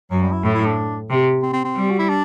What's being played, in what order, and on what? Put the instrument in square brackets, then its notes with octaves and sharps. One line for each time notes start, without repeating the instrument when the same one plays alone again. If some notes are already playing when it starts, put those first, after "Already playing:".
[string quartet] F#2 [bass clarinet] F#3
[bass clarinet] G3
E4
[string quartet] A2 [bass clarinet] E4
[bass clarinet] E4
D4
[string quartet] C3
[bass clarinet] C4
C4
C4
[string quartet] G3
[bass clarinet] F#4
E4
D4